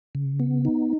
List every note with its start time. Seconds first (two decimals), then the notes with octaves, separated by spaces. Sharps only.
0.15 C#3
0.40 B3
0.65 D#4